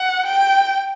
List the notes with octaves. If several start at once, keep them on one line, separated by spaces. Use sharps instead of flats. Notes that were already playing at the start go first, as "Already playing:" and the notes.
Already playing: F#5
G5